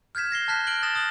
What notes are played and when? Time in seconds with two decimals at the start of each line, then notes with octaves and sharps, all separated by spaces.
0.15 F6 G6 G#6 B6 E7
0.31 G6 A#6 C7 G7
0.48 A5 F6 F#6 B6
0.67 F6 F#6 D7 F#7 G7
0.83 D#6 A6 A#6 E7
0.95 D#6 F#6 F#7